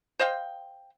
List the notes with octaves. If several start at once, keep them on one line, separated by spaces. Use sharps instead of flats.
C5 D#5 F5 G5